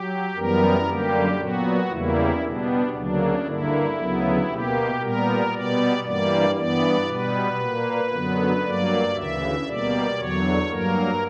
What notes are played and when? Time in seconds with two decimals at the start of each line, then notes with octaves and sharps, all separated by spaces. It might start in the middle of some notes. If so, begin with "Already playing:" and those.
Already playing: F#3 G4
0.35 F#2 E3 G3 B3 A#4
0.87 F#2 D3 G3 A#3 G4
1.38 A#2 F#3 B3 F#4
1.89 E2 C#3 E3 G3 A#3 E4
2.41 B2 G3 B3 D4
2.93 D2 C#3 F#3 A#3 D4
3.45 G2 D3 A#3 E4
3.97 D2 C#3 F#3 B3
4.48 B2 A#3 G4
5.00 A#2 G3 B3 A#4
5.52 B2 G3 B3 D5
6.04 G2 E3 G3 A#3 D5
6.55 G2 E3 B3 D5
7.07 B2 G3 B3 B4
7.59 A#2 A#3
8.10 F#2 D3 F#3 B3
8.62 G2 F#3 A#3 D5
9.14 D2 C#3 E3 E5
9.66 B2 G3 A#3 D5
10.17 E2 D3 F#3 C#5
10.68 G2 F#3 A#3 A#4